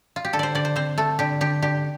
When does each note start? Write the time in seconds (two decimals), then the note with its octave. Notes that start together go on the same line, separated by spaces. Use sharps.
0.16 F4
0.25 G4
0.33 D3 A4
0.39 C5 D5
0.55 D3 D5
0.65 C5
0.76 C4 C5
0.98 A3 A4
1.19 D3 G4
1.41 D3 G4
1.62 D3 G4